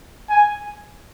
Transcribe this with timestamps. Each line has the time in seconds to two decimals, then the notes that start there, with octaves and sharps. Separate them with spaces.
0.30 G#5